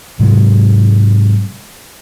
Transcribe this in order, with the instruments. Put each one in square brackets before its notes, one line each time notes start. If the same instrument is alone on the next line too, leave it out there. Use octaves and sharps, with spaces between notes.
[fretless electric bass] G#2 C3 F#3 G#3